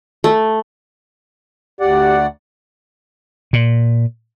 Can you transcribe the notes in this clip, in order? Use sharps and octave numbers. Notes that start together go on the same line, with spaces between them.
A3
D2 G4 D5 F#5
A#2